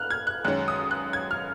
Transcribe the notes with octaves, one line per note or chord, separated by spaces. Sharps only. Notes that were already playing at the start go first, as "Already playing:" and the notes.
Already playing: F6 F#6
G#6
F#6
F#2 D#3 G#3 C#4 F#6
D#6
F#6
G#6
F6